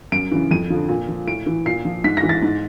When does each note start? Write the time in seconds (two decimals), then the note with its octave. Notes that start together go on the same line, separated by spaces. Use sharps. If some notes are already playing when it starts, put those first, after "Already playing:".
0.12 F#2 D7
0.32 C#3 E3
0.51 F2 D#7
0.70 D3 F3
0.89 A#2
1.08 F3
1.27 A2 D7
1.46 E3
1.66 A#2 C7
1.85 F3
2.04 G#2 B6
2.17 A#6
2.23 E3
2.29 A6
2.43 G#2